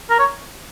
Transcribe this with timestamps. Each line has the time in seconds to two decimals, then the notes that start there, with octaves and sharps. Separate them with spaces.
0.10 A#4
0.19 C#5